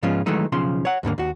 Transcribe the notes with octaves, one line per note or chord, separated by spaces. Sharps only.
G#2 F3 G#3 B3 C#4 F4
D#3 E3 F#3 G#3 A3 D#4
B1 C#3 F3 C6
C#5 F#5
D#2 G#2 D3 A#3
D#2 F#4